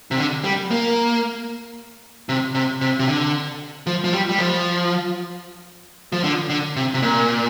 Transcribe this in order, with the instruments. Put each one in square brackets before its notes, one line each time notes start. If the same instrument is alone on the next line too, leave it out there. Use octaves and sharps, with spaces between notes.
[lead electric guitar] C3
D3
G3
A#3
C3
C3
C3
C3
D3
F3
F3
G3
G3
F3
F3
D3
D3
C3
C3
A#2